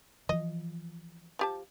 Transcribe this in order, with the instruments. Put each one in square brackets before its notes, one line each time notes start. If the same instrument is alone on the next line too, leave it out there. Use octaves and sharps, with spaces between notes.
[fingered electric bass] E3 F3 [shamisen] D#5
[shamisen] F3 G4 A5